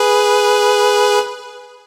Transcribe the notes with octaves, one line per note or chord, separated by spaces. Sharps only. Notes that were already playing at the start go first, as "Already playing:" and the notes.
Already playing: G#4 B4